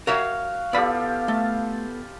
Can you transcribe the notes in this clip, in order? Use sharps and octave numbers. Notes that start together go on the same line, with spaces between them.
F#4 A#4 C#5 E5 F5
B3 E4 F4 G4 A4 D5 B5
A3 A5